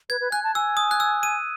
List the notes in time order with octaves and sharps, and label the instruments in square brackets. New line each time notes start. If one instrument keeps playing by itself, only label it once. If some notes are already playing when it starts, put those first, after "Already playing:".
[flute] B4 [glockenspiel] G#6
[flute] B4
[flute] G#5 [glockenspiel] F#6
[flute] A5
[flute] G#5 [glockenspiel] E6
[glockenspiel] D#6
F#6
E6
D#7